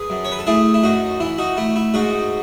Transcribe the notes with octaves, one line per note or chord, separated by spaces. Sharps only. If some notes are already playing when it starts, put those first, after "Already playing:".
Already playing: G#4 B4
F#2
C#5
B4
A4
A3 E4 G#4
E4
F#2 D#4 F#4
E3 E4
D#4 F#4
A3 E4
E4
G#2 D#4 F#4